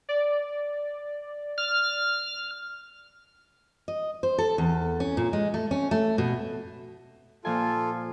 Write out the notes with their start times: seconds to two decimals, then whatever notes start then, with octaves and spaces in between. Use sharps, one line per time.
0.09 D5
1.58 F6
3.88 D#5
4.23 C5
4.38 A4
4.58 E2
5.00 C#4
5.17 A#2
5.33 G#3
5.54 A3
5.71 C#4
5.91 A3
6.18 B2
7.45 A#2 F3 F4 A4 G#5